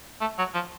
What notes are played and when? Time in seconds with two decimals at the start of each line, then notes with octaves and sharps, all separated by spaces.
0.21 A3
0.39 F#3
0.54 F3